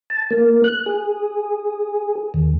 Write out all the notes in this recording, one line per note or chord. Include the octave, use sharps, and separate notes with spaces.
A5
A#3
F#6
G#4
D#2